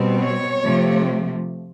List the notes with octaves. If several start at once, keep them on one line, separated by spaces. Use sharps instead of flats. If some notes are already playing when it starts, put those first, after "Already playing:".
Already playing: B2 G3 C4
C#5
C3 F3 A3